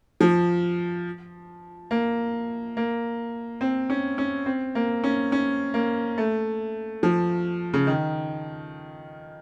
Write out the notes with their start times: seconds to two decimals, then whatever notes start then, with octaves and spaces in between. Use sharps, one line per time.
0.21 F3
1.91 A#3
2.77 A#3
3.61 C4
3.90 C#4
4.18 C#4
4.46 C4
4.75 A#3
5.04 C#4
5.32 C#4
5.74 A#3
6.18 A3
7.03 F3
7.74 C#3
7.87 D#3